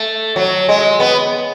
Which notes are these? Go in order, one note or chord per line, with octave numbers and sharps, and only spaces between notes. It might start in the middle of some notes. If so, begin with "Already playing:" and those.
Already playing: A3
F#3
G#3
B3